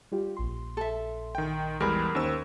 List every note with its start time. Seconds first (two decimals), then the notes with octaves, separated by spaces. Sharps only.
0.12 G3 F4 G4
0.37 A#1 C6
0.77 A4 E5
1.35 D#3 G5
1.80 E2 G3 G#3 A#4 B5
2.15 D#2 C#4 D#4 C5 E6